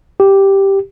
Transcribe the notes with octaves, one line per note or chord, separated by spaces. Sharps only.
G4